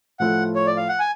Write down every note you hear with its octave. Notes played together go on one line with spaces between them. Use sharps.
A2 F3 A3 F4 A4 F#5
C#5
D5
F5
F#5
G#5